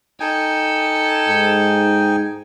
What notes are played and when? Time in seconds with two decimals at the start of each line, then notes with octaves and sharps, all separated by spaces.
0.20 D#4 A4 G5 G#5
1.29 G#2